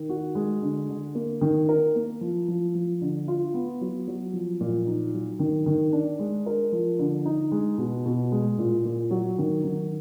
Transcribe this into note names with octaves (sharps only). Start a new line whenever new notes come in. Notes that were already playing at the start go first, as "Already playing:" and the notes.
Already playing: D#3
F#4
G#3
D3
D3
A#3
D#3
A#4
A#3
F3
F3
F3
D3
F4
B3
F#3
F#3
F3
A#2
D#4
F#3
D#3
D#3
D4
G#3
A#4
F3
D3
D#4
G#3
B2
B2
G#3
A#2
A#2
F#3
D#3
D#3